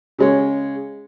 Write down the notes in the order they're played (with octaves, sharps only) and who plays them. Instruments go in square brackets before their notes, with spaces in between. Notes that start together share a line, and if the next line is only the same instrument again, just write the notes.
[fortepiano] C#3 G#3 C#5